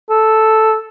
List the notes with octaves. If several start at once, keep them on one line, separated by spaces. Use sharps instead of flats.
A4